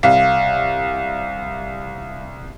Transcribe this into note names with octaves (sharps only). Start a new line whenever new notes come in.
C2 F5